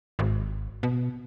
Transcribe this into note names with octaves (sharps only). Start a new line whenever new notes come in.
G#1
B2